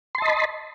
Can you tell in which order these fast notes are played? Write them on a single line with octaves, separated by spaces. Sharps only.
C6 A5 D#5 B5